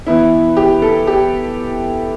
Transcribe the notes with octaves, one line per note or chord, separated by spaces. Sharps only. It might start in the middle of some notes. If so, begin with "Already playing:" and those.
E3 B3 E4
G4
A4
G4